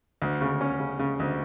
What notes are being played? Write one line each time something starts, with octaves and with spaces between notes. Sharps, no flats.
D2
C#3
C#4
C#3
C#3
D2